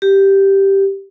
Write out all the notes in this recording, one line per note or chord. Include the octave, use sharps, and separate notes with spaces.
G4